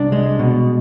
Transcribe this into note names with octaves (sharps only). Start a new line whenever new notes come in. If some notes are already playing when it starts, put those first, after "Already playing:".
Already playing: C2 D4
G#3
B2